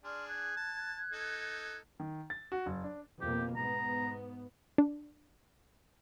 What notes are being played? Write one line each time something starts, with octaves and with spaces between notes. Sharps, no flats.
D4 G#4 D5 C6 F6
F#6 G#6
A5
D#4 A4
D#3
A6
F#4
F#1
D4
F2 B2 A#3 G4
G#2 B3 A#5
D4